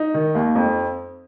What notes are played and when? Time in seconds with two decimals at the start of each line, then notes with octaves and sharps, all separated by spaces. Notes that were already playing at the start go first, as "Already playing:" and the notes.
Already playing: D#4
0.14 D#3
0.35 D#2
0.55 F2